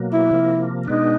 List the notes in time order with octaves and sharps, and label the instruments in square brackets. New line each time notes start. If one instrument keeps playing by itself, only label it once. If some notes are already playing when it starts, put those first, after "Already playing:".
Already playing: [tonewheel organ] B2 F#3 A#3
[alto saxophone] E4
[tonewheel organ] C3 F3 A#3
[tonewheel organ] B2 G#3 B3 D4 [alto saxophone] D#4